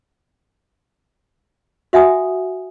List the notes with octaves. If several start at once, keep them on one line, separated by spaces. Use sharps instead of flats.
F#4 E5 F#5 G#5 D#6